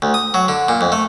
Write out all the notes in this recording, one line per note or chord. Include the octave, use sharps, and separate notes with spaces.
D2
D#6
F#3
D3
A#2
F2
A3